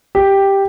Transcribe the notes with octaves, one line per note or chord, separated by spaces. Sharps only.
G4